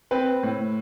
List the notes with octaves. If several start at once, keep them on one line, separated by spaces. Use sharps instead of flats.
C4 B4
A2